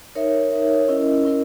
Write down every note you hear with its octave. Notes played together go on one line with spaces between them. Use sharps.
D#4 A#4 C#5 E5
D#4 A#4 C#5 E5
C#4 E4 A#4 D#5
C#4 E4 A#4 D#5